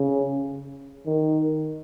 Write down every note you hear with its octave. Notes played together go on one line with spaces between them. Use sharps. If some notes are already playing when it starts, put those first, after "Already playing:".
Already playing: C#3
D#3